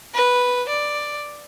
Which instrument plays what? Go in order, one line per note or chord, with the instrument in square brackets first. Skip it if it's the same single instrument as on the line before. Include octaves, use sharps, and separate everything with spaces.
[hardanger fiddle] B4
D5